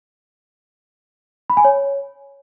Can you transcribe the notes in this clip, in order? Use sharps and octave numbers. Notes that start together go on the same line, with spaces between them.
B5
G#5
C#5